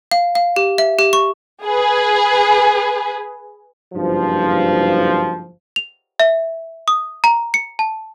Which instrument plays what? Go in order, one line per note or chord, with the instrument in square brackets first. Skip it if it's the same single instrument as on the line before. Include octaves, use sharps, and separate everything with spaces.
[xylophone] F5
F5
G4
E5
G4
C#6
[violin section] G#4 B4
[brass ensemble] F#1 G2 F3
[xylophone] F7
E5
D#6
A#5
C#7
A5